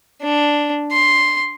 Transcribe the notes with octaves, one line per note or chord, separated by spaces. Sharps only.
D4
C6